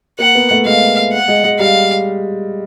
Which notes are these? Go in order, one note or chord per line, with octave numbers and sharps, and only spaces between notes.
A#3 F#5
B3
A3
G#3 F5
F#5
G#3
G#3
G3 F5